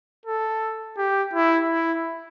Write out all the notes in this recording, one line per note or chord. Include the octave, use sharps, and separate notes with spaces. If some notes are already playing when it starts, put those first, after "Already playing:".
A4
G4
E4
E4